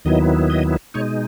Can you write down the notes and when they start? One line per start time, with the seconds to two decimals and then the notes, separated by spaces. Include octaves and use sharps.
0.05 D#2 D#3 F#3 B3 E4 D#5
0.50 D#5
0.94 B2 G#3 D#4 C#5